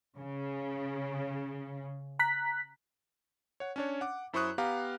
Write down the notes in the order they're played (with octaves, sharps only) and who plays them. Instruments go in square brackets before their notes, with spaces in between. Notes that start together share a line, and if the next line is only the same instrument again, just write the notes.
[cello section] C#3
[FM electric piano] A#5 F#6 B6
[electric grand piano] C#5 F#5
C#4 D4 C#5
F#5 D6
F#2 E4 C5 C#6 D#6 F#6
B3 G4 F5 A#5